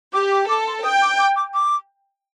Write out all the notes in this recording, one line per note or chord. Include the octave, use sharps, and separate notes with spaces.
G4 D6
D6
A4 D6
C6
G5 D#6
D6
D6
D6
D6